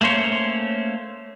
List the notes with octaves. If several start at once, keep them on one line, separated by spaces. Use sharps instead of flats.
A3 A#3 C#4 C5 C#5